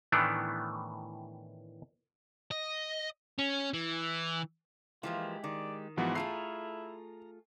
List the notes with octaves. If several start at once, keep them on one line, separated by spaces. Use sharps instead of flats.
A2 D#3 E3 A3 B3 D4
D#5
C#4
E3
E3 F3 G#3 A#3 F4 G4
D#3 D5
G#2 E3 F3 B3 F#4
A3 E4 F4 G#4 A#5 C7